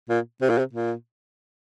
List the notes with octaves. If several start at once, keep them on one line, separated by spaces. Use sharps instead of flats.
A#2
C3
A#2
C3
A#2